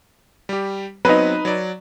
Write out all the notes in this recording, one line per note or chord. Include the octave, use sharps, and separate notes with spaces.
G3 G4
F#3 B3 C4 D#4 B4
F#3 D5